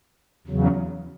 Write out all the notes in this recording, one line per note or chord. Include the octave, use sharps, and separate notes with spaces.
E2 C#3 F#3